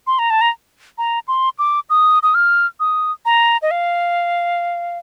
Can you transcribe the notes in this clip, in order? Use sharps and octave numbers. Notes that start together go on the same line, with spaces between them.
C6
A#5
A5
A#5
A#5
C6
D6
D#6
D#6
F6
D#6
A#5
D#5
F5